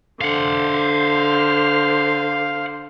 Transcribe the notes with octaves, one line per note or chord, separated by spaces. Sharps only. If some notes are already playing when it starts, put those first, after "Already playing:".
D3 C5 F5 F#5